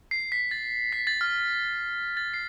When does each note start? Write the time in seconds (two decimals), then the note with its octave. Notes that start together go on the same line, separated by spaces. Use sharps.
0.11 C7
0.32 B6
0.51 A6
0.92 B6
1.07 A6
1.21 F6
2.17 A6
2.34 C7